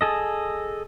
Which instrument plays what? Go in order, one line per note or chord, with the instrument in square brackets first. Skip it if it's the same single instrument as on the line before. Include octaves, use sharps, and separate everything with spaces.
[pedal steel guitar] G#4 A4 D#5